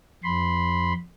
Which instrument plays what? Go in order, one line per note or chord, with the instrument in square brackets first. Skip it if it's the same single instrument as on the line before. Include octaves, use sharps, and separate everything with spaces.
[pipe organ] F2 B5 C6